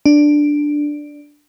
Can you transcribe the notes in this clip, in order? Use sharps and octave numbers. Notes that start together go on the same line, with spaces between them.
D4